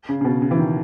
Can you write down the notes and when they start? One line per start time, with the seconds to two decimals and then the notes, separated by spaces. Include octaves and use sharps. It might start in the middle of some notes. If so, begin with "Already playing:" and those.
0.09 C#3
0.21 C#3
0.25 B2
0.42 C#3
0.51 E3
0.59 D#3